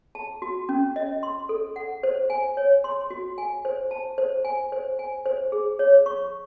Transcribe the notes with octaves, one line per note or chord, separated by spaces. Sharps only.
A5
F#4
C#4
D#5
C6
A4
F#5
C5
G#5
C#5
C6
F#4
G#5
C5
A5
C5
G#5
C5
G#5
C5
G#4
C#5
C#6